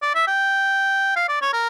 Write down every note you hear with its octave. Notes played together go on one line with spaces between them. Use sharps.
D5
E5
G5
F5
D5
C#5
A#4